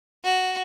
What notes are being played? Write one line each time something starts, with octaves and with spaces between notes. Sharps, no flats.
F#4